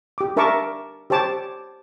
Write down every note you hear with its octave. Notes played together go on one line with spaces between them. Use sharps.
G4 D6
D4 A#4 E5 A5 C#6 D6
G4 C5 C#5 A5 D6